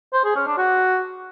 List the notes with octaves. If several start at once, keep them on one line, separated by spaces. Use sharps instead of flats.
C5
G#4
C#4
D4
F#4